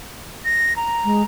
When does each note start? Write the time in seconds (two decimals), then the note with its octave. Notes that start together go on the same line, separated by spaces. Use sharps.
0.45 A#6
0.76 A#5
1.04 G#3